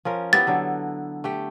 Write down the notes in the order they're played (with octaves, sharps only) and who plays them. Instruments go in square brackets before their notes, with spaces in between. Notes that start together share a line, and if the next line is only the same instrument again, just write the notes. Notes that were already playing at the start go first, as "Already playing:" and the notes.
[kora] F3 C#4 A#4
[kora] B3 E4 G4 [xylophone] A6
[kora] D3 F#3 A4
A3 G4 G5